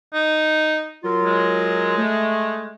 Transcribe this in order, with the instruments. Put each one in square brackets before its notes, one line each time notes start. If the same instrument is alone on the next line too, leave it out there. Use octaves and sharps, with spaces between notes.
[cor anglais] D#4
[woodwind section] F#3 F4 A#4
[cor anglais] G#3
[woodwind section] A3